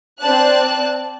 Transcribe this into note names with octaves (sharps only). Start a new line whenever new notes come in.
C4 D5 A5 F#6